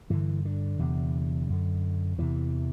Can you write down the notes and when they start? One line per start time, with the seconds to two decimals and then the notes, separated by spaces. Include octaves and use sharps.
0.10 G2 D3 E3
0.45 D3
0.79 E2 C3
1.49 F#2 D3
2.18 E2 C3 E3